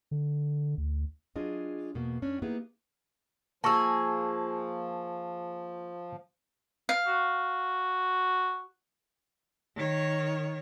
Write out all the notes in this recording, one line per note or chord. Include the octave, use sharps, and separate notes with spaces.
D3
D2
F#3 D4 F4 G#4 D#5
E2 B2 A#3
F#2 C#4 D4
A#3 B3 D#4 E4 G4 G#4
F3 A#3 G#4 A5 C#6 E6
F5
F#4
D#3 C#5